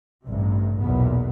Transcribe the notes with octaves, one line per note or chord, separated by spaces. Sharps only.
A1 G2 C3
B1 E2 A#2 B3